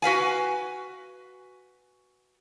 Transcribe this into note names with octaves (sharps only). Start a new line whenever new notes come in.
F#4 B4 F5 G#5